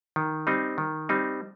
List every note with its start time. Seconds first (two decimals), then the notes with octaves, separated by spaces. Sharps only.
0.16 D#3
0.47 G3 C4 D#4
0.78 D#3
1.09 G3 C4 D#4